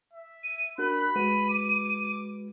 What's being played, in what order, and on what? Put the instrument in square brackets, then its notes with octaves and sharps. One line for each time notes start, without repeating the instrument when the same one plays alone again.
[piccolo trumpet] E5
[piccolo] D#7
[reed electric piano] D4 F#4 A#4 [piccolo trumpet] B5 [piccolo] F#6
[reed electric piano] G#3 F#4 B4 [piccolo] D#7
[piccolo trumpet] D6